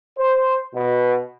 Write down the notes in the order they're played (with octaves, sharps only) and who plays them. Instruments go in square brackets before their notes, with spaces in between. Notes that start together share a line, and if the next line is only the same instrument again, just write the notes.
[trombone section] C5
B2